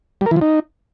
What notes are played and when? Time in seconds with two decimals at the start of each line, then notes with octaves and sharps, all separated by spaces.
0.21 G3
0.26 A#4
0.31 E3
0.36 F3
0.41 D#4